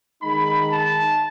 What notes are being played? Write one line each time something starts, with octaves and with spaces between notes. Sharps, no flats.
D#3 G#3 D#4 B5
A5